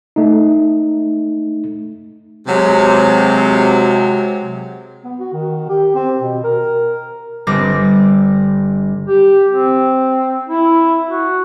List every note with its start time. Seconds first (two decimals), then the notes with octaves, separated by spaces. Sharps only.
0.16 A3 D#4
2.47 C3 F#3 G#3
5.04 B3
5.20 F#4
5.33 D#3
5.69 G4
5.95 C4
6.19 B2
6.44 A#4
7.47 G1 D3 G3 C4 D6 A#6
9.07 G4
9.51 C4
10.49 E4
11.08 F#4